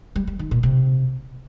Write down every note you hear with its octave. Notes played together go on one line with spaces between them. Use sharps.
G3
G3
D#3
A#2
C3